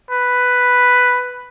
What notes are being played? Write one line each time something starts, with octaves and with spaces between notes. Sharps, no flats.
B4